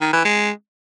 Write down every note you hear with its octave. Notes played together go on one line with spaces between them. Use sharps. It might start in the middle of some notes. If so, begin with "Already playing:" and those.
D#3
E3
G#3